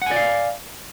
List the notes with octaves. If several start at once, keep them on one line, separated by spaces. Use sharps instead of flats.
D5 F5 F#5 G#5